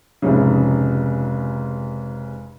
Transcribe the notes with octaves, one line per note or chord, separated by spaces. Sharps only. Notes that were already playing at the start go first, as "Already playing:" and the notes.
F1 G#2 C#3